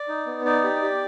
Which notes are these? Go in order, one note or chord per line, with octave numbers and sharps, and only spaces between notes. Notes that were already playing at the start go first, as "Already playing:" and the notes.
Already playing: D5
D#4
B3
D#4 D5
G4
G4